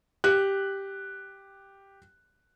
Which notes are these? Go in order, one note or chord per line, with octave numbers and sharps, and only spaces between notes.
G4 F#6